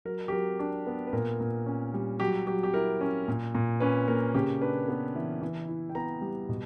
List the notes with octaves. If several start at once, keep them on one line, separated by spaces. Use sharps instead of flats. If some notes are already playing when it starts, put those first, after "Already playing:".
F#3 A#4
G4
F#3 A#4
D4
B3
B4
A#2 A#4
A#2
C#4
G3
F#3 G4
F#3 G4
G4
E4 A#4
C#4
A#2
A#2
C#4 B4
A#3 A#4
C#3 G4
D4 B4
B3
E3
E3
E4
G5
B3 A#5
G3
B2